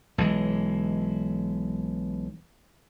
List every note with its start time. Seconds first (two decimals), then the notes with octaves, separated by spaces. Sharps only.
0.18 B1 E3 G#3